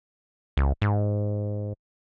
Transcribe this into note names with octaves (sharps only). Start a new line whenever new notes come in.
C#2
G#2